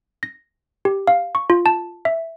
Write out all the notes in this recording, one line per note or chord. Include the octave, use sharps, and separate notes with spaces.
A#6
G4
F5
C#6
F4
A5
E5